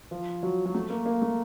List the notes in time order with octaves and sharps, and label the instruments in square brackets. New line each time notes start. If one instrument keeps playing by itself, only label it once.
[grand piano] F3
F#3
F#3
A3
A#3
A#3
A3